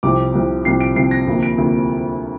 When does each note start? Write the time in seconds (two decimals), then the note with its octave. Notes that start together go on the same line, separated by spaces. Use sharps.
0.03 C2 C3 F3 C4 D6
0.34 C2 C3 F3 C4
0.65 C2 C3 F3 C4 C7
0.81 D7
0.96 C2 C3 F3 C4 C7
1.11 A#6
1.27 D2 C3 F3 A#3
1.43 D7
1.58 D2 C3 F3 A#3